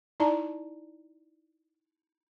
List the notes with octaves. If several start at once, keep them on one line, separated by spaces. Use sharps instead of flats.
D#4 E4 D5 A5 A#5